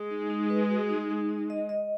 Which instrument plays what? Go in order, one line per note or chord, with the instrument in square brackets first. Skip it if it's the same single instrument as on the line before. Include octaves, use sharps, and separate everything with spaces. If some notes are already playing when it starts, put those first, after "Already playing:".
Already playing: [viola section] G#3
[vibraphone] D#4
D#4
B4
F#4
D#4
D#4
D#4
D#5
D#5